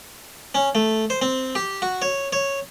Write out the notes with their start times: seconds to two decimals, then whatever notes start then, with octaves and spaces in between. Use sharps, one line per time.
0.55 C#4
0.75 A3
1.10 C5
1.22 C4
1.55 G4
1.82 F#4
2.02 C#5
2.33 C#5